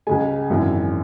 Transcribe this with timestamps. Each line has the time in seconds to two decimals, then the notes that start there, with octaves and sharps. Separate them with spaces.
0.07 C#2 C#3 G#3 G#5
0.50 G#1 F#2 E3